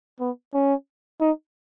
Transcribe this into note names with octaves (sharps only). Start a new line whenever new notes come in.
B3
C#4
D#4